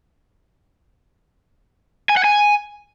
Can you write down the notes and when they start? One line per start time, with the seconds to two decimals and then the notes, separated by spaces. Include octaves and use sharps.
2.09 G#5
2.17 F#5
2.24 G#5